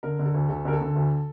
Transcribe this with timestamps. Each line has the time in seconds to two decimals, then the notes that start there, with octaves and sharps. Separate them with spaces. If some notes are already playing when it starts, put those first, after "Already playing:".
0.03 D3 A#4
0.19 D3
0.26 A4
0.34 D2
0.49 D2 A4
0.65 D3 A#4
0.73 A4
0.81 D3
0.95 D2